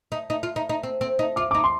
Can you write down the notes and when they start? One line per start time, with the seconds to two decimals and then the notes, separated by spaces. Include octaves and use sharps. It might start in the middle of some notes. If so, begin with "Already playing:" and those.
0.12 D#4
0.30 D#4
0.43 F4
0.56 D#4
0.69 D#4
0.83 C4
1.01 C4
1.19 D#4
1.36 F4 D6
1.51 D#4 D6
1.64 C6